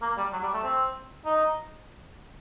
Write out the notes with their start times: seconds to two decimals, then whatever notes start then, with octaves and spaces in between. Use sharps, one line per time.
0.02 A#3
0.17 G3
0.33 F#3
0.43 G3
0.54 A3
0.63 C4
1.25 D#4